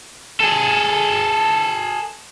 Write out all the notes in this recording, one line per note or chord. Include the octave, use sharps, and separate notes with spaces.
G#4 A4